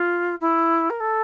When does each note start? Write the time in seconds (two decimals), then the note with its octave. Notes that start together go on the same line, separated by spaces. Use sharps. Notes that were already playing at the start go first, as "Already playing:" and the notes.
Already playing: F4
0.41 E4
0.90 A#4
1.00 A4